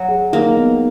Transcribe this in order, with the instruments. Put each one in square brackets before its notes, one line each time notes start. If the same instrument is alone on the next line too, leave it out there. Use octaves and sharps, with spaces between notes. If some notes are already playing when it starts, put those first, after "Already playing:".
Already playing: [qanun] F#3
[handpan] G#4
[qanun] A#3 [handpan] D#4
[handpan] B3